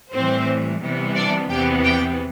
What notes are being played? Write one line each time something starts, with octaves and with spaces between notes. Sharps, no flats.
A2 E3 G3 C4 C5
C3 E3 G3 B3
D4 D5
E2 C3 E3 B3 G4 G5
G4 G5